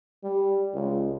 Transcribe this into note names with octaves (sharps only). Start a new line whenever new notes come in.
G3
C#2